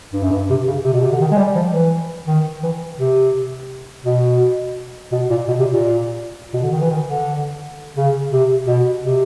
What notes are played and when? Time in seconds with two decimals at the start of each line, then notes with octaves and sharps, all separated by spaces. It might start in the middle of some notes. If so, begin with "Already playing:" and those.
0.13 G2
0.23 F#2
0.31 G2
0.50 C3
0.68 C#3
0.85 C3
0.93 B2
1.03 C3
1.12 D3
1.21 D#3
1.31 G#3
1.38 G3
1.55 F3
1.73 E3
2.27 D#3
2.63 E3
2.99 C3
4.05 B2
5.12 B2
5.30 A#2
5.48 B2
5.59 C3
5.71 A#2
6.54 B2
6.63 D3
6.72 D#3
6.81 E3
6.90 D#3
7.07 D3
7.97 C#3
8.32 C3
8.67 B2
9.03 C3